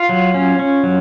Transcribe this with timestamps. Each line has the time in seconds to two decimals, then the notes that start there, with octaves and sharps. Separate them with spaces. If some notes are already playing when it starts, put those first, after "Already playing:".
Already playing: F4
0.09 F#3
0.34 C#4
0.59 C#4
0.83 F#3